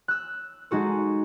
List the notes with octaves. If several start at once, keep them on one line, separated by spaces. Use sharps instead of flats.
E6 F#6
G#3 D#4 F#4 A4